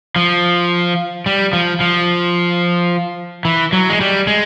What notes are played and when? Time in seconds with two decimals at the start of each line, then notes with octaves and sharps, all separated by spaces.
0.16 F3
1.26 G3
1.53 F3
1.80 F3
3.45 E3
3.73 F#3
3.90 G#3
4.01 G3
4.27 G#3